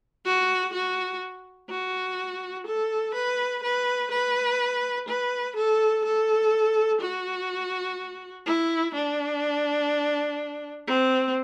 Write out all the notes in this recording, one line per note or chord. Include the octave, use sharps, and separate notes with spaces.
F#4
F#4
F#4
A4
B4
B4
B4
B4
A4
A4
F#4
E4
D4
C4